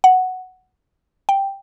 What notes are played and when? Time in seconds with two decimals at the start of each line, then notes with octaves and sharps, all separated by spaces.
0.04 F#5
1.29 G5